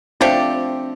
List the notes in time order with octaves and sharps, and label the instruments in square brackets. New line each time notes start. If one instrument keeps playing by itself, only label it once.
[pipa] F3 A3 D4 G4 [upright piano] C4